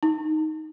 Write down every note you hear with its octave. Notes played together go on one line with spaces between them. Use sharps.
D#4